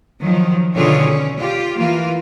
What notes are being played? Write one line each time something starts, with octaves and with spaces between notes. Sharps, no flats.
D#3 F3 F#3
B2 D3 D#3 F4 G#4 C#5
C#4
F4 G4
E3 A#3 F4